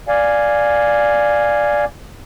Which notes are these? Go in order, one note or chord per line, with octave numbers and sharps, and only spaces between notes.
D5 F5 G#5